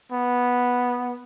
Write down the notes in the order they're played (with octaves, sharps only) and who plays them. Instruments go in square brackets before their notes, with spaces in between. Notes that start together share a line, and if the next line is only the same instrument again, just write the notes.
[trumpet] B3